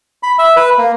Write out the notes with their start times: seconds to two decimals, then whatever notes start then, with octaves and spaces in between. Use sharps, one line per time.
0.23 B5
0.39 E5
0.56 B4
0.78 A#3